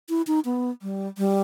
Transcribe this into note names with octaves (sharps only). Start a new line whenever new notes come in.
E4
D#4
B3
G3
G3